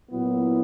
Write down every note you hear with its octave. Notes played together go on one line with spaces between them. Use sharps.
A#2 F#3 B3 E4